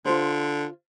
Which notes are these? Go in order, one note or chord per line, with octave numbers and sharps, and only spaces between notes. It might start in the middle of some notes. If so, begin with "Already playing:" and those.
D3 F4 C5